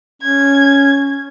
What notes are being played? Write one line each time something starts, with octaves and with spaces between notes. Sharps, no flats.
C#4 G#6